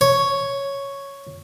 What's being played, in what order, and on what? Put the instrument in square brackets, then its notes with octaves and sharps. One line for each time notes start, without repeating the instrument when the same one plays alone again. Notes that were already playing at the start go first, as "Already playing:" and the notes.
[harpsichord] C#5